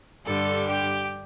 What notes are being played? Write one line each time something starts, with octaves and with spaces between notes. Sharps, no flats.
G2 D3 G3 A4
G4